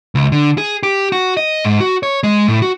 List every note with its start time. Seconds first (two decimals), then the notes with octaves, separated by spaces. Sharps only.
0.15 C#2
0.32 D3
0.58 G#4
0.83 G4
1.12 F#4
1.37 D#5
1.65 G#2
1.80 F#4
2.03 C#5
2.23 G#3
2.48 A2
2.62 F#4